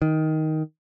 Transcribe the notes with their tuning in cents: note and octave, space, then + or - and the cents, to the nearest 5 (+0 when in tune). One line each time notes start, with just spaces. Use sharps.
D#3 +10